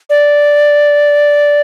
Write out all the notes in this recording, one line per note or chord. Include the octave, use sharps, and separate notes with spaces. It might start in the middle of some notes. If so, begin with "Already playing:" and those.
D5